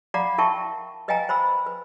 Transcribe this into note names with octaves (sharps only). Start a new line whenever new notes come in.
D5 F5 F#5 A#5 B5 D6
E4 A#4 E5 G5 A5 C#6
B4 D#5 F5 G5 G#5 A#5
C5 B5 E6
B4